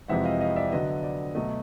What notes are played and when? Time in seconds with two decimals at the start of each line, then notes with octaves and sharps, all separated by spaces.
0.08 F2 C3 E3 G#3 C4 E5 F#5
0.25 D#5 F5
0.40 D#5 F5
0.56 D5 E5
0.72 D3 F#3 B3 D#5
1.03 D5
1.35 B2 F#3 A3 D#5